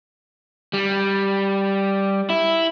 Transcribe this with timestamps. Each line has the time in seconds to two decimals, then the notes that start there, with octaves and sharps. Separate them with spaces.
0.73 G3
2.30 E4